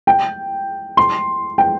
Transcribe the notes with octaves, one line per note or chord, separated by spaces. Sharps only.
G5
C6
G5